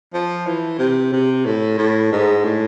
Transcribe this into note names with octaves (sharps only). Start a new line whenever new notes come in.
F3
E3
C3
C3
A2
A2
G#2
A2